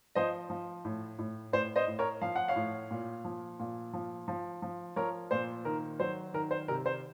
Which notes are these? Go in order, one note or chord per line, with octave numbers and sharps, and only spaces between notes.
F3 C5 D#5
F3
A2
A2
A2 C5
C5 D#5
A2
A#4 C#5
F3 F5
F#5
C#5 F5
A2
A#2
F3
A#2
F3
F3
F3
F3 A#4 C#5
A#2 C5
D#3 A#4
F#3 C5
D#3 A#4
C5
C3 A#4
C5